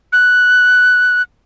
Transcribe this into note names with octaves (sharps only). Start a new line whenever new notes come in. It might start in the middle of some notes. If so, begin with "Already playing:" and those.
F#6